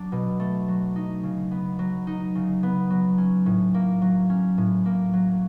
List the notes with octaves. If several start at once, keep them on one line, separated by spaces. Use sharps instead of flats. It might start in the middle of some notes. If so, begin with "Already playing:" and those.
Already playing: F#3 D4
B2
A3
F#3
D#4
C#3
B3
F#3
D#4
C#3
B3
F#3
C#4
A2
A#3
F#3
C#4
A2
A#3
F#3